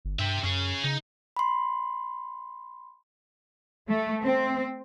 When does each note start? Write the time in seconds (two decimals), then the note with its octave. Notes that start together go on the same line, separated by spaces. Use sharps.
0.05 G1
0.19 G2 G4 E5
0.44 F#2 C#4 G#4
0.84 C#3 D#4
1.37 B5 C6
3.88 A3
4.23 C4